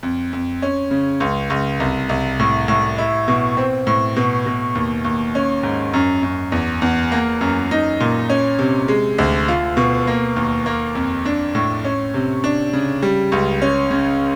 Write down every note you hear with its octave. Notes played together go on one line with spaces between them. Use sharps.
F2
F2
C#4
C#3
C#2
C#2
C2
C2
A2
A2
E4
B2
C4
A2
B2
B2
D#2
D#2
C#4
G#2
F#2
F#2
E2
E2
A#3
F#2
D#4
A#2
C#4
C3
G#3
D2
F4
B2
A#3
D#2
A#3
F2
D4
A2
C#4
C3
D4
C#3
G3
C#2
C#4
C#3